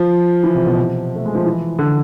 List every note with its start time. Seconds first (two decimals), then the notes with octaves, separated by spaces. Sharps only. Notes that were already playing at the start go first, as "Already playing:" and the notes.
Already playing: F3
0.43 E3
0.55 C3
0.66 B2
0.77 C3
1.16 A3
1.25 G#3
1.35 F3
1.45 E3
1.79 D3